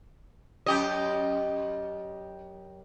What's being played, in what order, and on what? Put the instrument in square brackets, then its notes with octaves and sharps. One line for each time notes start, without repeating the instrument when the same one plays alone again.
[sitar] F#2 G4 D#5